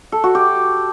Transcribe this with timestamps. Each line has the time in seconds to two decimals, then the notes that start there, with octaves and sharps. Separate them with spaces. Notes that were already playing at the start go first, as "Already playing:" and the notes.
0.12 A4
0.24 F#4
0.35 G4